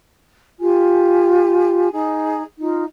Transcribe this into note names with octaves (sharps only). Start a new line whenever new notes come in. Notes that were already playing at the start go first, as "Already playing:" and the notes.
F4 G4 G#5
D#4 G#4
D#4 F4